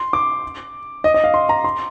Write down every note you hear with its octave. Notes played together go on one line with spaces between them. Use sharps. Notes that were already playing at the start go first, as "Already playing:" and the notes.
Already playing: C6
D6
D#5
D#5
F5
C6
A#5
C6